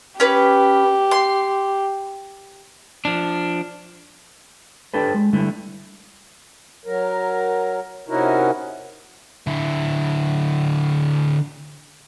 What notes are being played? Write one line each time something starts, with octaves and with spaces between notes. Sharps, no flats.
C#4 G4 B4
C6
F3 D4
D4 G4 A4 B4
G#3
D3 G3 A3 E4
F#3 A#4
C3 C#4 D#4 E4 F#4 A#4
D3 E4